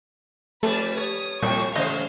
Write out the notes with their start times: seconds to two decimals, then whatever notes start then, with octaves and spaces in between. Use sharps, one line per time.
0.63 F2 G3 A3 B4 A5
0.97 C#5 D#6
1.42 C2 F2 A#2 G5 C#6
1.75 A1 C#3 C5 D#5 F5